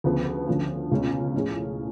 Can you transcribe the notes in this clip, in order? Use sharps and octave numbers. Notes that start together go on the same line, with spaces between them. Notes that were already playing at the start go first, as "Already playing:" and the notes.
D2 C#3 F3 B3
D2 D3 F3 A3 C#4
C#2 B2 G#3 C#4
A2 F3 A3 C#4 G#4